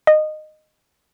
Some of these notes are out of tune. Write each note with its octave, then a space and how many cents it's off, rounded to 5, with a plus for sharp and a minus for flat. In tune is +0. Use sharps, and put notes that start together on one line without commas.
D#5 -15